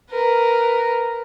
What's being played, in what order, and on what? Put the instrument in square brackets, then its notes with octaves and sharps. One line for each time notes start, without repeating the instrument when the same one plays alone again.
[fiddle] A#4 B4